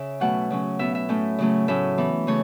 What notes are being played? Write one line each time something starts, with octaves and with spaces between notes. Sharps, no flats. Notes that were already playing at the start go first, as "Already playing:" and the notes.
Already playing: C#3 E5
B2 F#3 A3 C#4 F#5
C#3 F#3 C#4
B2 B3 E5
E5
A2 A3 C#4
C#3 F#3 A3 C#4
A2 F#3 C#4 E5
E3 B3
C#3 A3 C#4 C#5